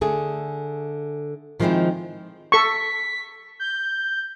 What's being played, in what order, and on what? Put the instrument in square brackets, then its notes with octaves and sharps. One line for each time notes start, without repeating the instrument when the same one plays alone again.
[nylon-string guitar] D3 A3 G#4
D#3 F3 G#3 C4 E4 C5
[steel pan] A4 C#6 [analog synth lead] B6
[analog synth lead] G6